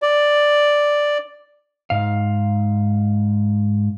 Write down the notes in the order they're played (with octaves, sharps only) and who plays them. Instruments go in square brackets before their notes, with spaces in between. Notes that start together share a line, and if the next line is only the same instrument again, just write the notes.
[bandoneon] D5
[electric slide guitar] G#2 F5